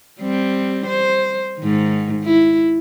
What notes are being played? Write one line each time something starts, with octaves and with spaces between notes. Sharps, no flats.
G3 C4
C5
G#2 D#3
E4